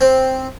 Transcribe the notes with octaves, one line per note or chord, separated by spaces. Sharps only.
C4